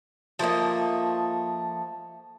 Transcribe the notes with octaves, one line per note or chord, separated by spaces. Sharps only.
F3 A3 A#3 D#5